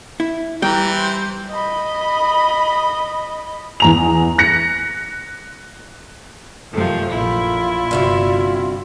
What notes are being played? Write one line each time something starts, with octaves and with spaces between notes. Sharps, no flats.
E4
E3 G3 G5 A#5
C5
D#5 B5
E2 A#5 F7
F#6 A#6 C#7
F#2 C3 D#3 F3 A3
A#1 A#2 E4 F4
G1 G2 C3 F#4